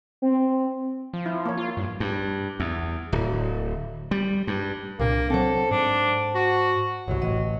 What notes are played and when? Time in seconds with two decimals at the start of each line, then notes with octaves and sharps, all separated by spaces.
0.22 C4
1.13 F3
1.26 E4
1.45 A#3 C#5
1.58 F4
1.77 G2
2.00 G2
2.60 E2
3.12 D1
4.11 G3
4.47 G2
5.00 C2 A#2 A#3 D4
5.30 F#3 C4 A4 C5 F#5 A5
5.71 G#2 D4
6.35 F#4
7.08 G1 C2 F#3
7.22 A1 D#5